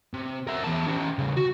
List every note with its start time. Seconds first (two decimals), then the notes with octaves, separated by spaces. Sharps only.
0.13 C3
0.47 A#4 E5
0.63 E2 A5
0.87 C#4 G4
1.18 C#3 G3
1.37 F#4